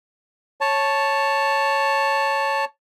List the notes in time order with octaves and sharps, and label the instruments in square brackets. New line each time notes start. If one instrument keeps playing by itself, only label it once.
[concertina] C#5 A5